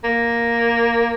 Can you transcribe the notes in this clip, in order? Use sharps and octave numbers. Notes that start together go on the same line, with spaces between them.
A#3